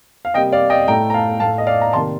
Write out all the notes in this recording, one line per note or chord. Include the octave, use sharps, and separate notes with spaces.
F5
C3 G3 A#3 D#5 G5
D5 F5
D#5 G5
A2 A3 G5 A#5
A#5
F5 A5
A2 A3 F5 A5
D#5
D5 F5
A#5
C3 D#3 A#3 A5 C6